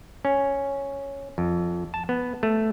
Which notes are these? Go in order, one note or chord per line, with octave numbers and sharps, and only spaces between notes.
C#4
F2
A5
B3
A3